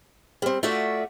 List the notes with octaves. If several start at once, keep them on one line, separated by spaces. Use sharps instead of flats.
G3 C4
A3 F4 F#4 D5 E5